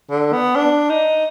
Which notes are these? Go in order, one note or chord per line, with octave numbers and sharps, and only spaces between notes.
D3
B3
D4
D#4